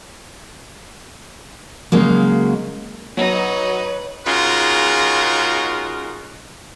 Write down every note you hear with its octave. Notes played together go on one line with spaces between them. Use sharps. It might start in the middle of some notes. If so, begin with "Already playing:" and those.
C#3 F#3 G#3 A#3
F#3 D#4 B4 C#5
C#3 G#3 D#4 F4 F#4 A#4